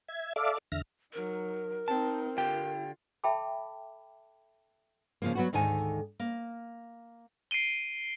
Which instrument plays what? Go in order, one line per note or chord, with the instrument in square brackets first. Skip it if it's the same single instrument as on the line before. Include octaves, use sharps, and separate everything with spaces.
[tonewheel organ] E5 G#6
A4 D5 E5 F5 D6
E2 D3 E5 F6 A#6
[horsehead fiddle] F#3 D#4 [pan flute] A#4
[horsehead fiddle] C4 D#4 [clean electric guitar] A5
[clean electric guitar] D3 G4 G5 [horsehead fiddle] F4
[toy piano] A4 E5 G5 A5 B5 D6
[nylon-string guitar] C#3 F3 A#3
F#3 B3 F#4
D2 G#2 D#3 A4 G#5
A#3
[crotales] C7 D7 D#7 G7